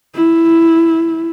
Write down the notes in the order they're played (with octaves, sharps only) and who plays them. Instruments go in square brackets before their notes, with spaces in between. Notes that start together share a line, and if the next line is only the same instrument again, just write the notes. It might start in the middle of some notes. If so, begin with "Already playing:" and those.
[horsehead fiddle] E4